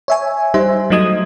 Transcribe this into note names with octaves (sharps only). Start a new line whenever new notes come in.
C#5 E5 G#5
G3 D#4 C5 E5
F#3 A3 D#4 D#6 G#6